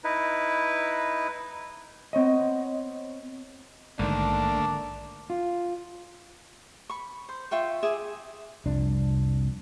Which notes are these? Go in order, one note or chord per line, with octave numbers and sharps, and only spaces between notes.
D#4 E4 B4
B3 C4 C#5 D#5
A#1 G#2 D3 D#3 A3 A#3 D4
F4
B5 C#6
C5
F4 E5 G5 C#6
G#4 E5 G#5 D6
C2 F2 D4